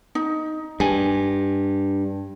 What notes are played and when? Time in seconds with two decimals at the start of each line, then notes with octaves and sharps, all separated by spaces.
0.15 D#4
0.80 G2 G#5